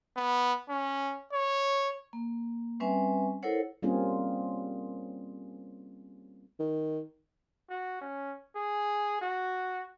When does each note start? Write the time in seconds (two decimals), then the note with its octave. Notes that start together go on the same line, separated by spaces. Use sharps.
0.17 B3
0.69 C#4
1.33 C#5
2.13 A#3
2.80 G3 C4 C#4 B4 E5 G#5
3.43 E4 A4 A#4 C5 C#5 F#5
3.82 G3 A#3 C4 C#4 F4 G#4
6.59 D#3
7.70 F#4
8.01 C#4
8.56 G#4
9.21 F#4